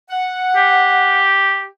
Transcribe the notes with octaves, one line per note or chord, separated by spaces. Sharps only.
F#5
G4